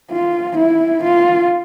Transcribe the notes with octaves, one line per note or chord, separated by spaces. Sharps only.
F4
E4
F4